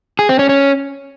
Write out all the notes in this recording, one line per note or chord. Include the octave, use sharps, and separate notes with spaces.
G#4
C4
C#4
C#4